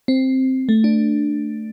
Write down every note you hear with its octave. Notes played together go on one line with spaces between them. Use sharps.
C4
A3
D4